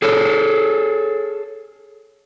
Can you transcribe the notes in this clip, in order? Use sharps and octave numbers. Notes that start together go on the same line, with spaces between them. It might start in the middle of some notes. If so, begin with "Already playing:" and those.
G#4 A4 C#5